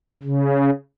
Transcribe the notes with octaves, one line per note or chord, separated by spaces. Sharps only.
C#3